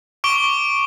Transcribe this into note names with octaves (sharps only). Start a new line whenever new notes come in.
C#6 D6 D7 G7